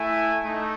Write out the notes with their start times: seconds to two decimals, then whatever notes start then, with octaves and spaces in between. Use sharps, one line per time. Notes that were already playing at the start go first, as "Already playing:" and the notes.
Already playing: A3 E4 E5 G#5
0.44 A3 D#4